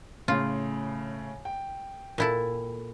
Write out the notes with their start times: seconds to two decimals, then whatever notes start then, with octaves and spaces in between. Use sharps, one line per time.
0.28 A2 C#3 F4
1.45 G5
2.18 A#2 E4 A4